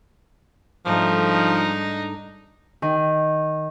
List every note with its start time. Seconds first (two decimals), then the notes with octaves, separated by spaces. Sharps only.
0.86 G#2 F3 G3 A3 D4 D#4
2.82 D#3